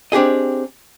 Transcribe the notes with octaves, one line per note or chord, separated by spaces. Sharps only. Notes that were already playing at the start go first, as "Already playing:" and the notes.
C4 D4 G4 G#4 D#5